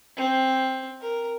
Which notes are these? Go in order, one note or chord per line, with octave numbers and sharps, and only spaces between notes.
C4
A#4